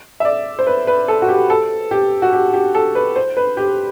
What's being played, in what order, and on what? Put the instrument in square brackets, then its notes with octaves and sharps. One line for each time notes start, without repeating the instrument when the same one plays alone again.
[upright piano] E5
D5
C5
B4
B4
A4
F#4
G4
A4
G4
F#4
G4
G4
A4
B4
C5
B4
G4